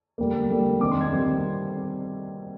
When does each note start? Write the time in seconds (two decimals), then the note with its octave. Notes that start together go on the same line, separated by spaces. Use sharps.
0.18 D3 G3 A#3
0.50 D3 G3 A#3
0.81 C3 D#3 G3 C4 D6
0.91 C6
1.01 G#6
1.12 C3 D#3 G3 C4